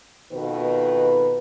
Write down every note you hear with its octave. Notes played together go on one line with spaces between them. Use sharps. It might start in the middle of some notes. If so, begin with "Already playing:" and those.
F2 B2 D#3 B4